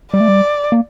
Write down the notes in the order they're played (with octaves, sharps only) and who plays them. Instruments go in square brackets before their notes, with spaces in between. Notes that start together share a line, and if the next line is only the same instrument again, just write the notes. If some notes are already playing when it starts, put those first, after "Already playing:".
[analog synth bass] G3 [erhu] D5
[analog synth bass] A3
G3
A#3